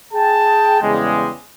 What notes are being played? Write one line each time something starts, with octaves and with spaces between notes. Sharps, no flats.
G#4 G5 A5
E2 C#3 G3 G#3